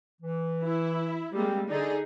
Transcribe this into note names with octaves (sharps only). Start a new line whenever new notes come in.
E3
E4
G3 G#3 A#3 C4 G4
D3 D#4 G#4 D5